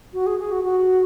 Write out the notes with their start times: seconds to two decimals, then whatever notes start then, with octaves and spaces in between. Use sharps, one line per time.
0.13 F#4
0.26 G#4
0.39 G#4
0.52 F#4
0.64 F#4